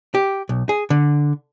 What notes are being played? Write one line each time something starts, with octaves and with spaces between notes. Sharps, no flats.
G4
B1
G#4
D3